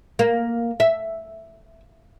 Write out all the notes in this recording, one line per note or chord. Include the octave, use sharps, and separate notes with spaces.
A#3
E5